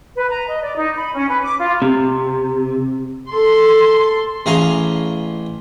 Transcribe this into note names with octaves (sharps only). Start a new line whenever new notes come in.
B4
A#5
D#5
D5
D#4
B5
C#4
B4
D6
F4
C3
A4 C6
A1 G#4 F5 G#5 A#5 C6